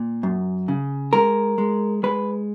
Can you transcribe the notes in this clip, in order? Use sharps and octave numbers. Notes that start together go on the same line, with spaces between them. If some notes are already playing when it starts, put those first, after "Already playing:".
Already playing: A#2
F#2
C#3
G#3 A#4
G#3
G#3 B4